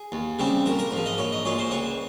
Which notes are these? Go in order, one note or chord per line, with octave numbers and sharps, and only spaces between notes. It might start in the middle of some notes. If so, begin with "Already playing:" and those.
Already playing: G#4
D#2
C#3 G3 C4
A#1 A#4
A#4
G#2 F3
D#5
A#1 C#5
D#5
A#2 G#3 C#5
C5
C#2 C#5